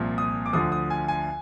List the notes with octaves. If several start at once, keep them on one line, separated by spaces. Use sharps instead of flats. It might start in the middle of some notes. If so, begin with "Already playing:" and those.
Already playing: C2 A#2 F3
D#6
D6
D2 D3 F3 D#6
D#6
G#5
G#5